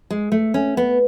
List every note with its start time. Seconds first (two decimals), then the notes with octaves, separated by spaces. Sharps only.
0.10 G#3
0.32 A3
0.54 C#4
0.77 B3